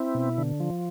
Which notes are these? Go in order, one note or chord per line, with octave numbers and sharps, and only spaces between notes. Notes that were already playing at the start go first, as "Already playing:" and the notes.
Already playing: C4 E4
B2
D3
F3